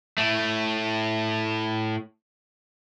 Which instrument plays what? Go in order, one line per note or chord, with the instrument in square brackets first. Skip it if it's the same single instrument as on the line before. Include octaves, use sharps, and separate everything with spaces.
[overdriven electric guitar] A2 A3